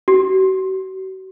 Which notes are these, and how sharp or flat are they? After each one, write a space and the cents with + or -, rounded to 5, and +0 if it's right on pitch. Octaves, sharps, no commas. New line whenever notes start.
F#4 +40